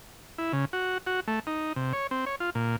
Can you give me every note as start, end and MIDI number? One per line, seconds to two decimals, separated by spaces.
0.38 0.52 64
0.53 0.65 49
0.73 0.98 66
1.06 1.20 66
1.28 1.40 57
1.47 1.73 63
1.76 1.93 48
1.93 2.07 73
2.11 2.25 60
2.26 2.36 73
2.40 2.50 65
2.55 2.76 46